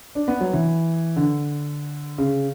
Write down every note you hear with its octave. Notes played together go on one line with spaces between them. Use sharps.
D4
B3
F#3
E3
D3
C#3